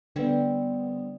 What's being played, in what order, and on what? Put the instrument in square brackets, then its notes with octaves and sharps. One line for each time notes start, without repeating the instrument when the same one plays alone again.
[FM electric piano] D3 B3 [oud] G3 C4